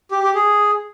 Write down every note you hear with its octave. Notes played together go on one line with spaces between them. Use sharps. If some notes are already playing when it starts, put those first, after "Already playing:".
G4
G4
G#4